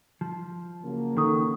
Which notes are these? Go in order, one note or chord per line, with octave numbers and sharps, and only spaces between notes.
F3
C#3 F#3 A#3
D#3 A4 C#6 D#6